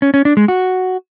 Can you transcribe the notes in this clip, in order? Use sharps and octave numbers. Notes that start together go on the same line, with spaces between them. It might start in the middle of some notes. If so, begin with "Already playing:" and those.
C#4
C#4
D4
G#3
F#4